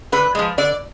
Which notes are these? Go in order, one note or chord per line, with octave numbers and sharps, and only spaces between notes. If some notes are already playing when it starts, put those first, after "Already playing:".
D3 B4
F3 G#3
D3 D5